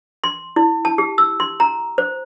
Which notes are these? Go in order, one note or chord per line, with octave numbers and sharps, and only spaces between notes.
C6
E4
A5
G4
E6
C6
A#5
C5